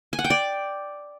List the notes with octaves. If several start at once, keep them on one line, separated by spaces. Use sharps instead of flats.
G#5
F#5
G5
D5